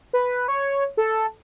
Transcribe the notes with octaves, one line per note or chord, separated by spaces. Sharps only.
B4
C#5
A4